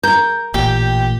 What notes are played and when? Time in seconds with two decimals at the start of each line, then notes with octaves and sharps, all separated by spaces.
0.04 A#4 G6
0.54 A1 A#2 G4 G5